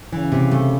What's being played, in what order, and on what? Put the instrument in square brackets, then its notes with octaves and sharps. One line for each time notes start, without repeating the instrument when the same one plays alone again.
[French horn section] C#3 [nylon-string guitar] E3
[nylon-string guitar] C3
A3